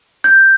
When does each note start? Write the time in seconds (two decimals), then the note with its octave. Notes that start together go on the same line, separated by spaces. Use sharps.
0.24 G6